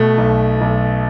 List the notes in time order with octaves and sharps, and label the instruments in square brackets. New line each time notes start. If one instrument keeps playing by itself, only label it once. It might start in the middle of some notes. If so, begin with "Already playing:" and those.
Already playing: [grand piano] B2 A3
B1
B1